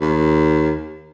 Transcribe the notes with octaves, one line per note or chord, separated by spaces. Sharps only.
D#2